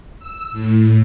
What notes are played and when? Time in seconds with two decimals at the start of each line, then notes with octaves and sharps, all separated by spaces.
0.19 E6
0.52 A2